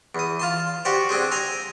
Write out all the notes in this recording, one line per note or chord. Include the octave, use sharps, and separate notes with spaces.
E2 D#6
F4 A5 C6
F#4 G4 C5 D5
C4 D4 G#4 C5
G5 G#5 A#5 C6